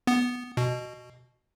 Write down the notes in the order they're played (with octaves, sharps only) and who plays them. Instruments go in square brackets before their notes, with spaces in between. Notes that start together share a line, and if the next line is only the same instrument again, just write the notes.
[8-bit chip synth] B3
B2